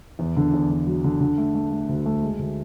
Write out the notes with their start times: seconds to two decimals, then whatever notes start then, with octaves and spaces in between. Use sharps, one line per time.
0.19 E2
0.36 D3
0.53 E2
0.70 D3
0.86 F#3
1.04 D3
1.20 D3
1.38 A3
1.55 A3
1.71 A3
1.89 D2
2.06 A3
2.22 G#3
2.39 D2